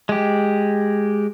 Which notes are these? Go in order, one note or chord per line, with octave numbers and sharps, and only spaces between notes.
G#3 G4